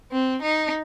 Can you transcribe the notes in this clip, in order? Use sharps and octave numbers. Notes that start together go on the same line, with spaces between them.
C4
D#4